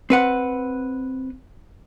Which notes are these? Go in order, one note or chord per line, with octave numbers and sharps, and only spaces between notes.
C4 B4 F#5